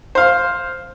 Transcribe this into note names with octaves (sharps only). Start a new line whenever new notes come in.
C5 F5